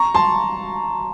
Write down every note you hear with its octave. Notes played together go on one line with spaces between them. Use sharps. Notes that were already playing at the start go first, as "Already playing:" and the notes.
Already playing: A#5 C#6
A5 C6